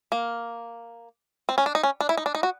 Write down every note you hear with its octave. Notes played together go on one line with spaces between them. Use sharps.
A#3
C4
C#4
D4
D#4
C#4
D4
E4
D#4
D4
D#4
F#4